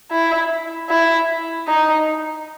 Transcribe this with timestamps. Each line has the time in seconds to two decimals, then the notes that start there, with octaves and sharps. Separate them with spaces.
0.11 E4
0.89 E4
1.68 D#4